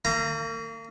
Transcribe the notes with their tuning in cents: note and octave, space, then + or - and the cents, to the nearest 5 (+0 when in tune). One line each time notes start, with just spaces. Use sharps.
A#3 -40 A#5 +0